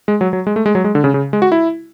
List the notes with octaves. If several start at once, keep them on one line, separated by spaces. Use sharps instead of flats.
G#3
F#3
F#3
G#3
A3
G#3
F#3
G#3
D3
C#3
C#3
G#3
F#4
E4